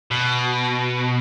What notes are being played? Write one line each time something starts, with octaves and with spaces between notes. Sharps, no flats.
B2